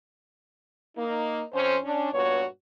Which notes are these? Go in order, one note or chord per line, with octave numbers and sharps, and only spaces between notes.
A#3 D#4
F2 C#4 C5
C#4 D4
G2 A#2 B3 F#4 C#5